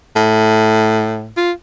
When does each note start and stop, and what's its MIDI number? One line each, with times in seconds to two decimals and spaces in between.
0.16 1.31 45
1.37 1.52 65